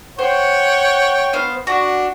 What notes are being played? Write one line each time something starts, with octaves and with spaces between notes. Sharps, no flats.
C5 C#5 F#5 G5
B3 C5 F5
D4 F#4